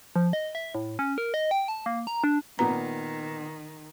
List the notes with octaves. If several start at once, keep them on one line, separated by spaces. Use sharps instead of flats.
F3
D#5
E5
A2
C#4
A#4
D#5
G5
A5
A#3
A#5
D4
A#2 D#3 B3 A#5